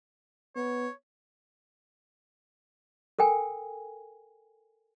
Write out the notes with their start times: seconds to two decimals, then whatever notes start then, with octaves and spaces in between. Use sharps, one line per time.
0.56 B3 C#5
3.19 A4 A#4 G5 G#5